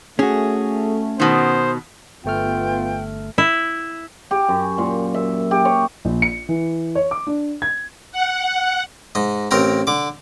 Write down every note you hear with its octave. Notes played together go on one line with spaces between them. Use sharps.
A3 C#4 F#4 G#4
B2 D#3 C5
G1 A3 B3 F4 G5 F6
E4
G4
F#2
A#2
E5
G4
C#5
A#1
C#7
E3
C#5
D6
D4
G#6
F#5
G#2 D#5
A1 C4 A#4 G5 A#5
D3 D6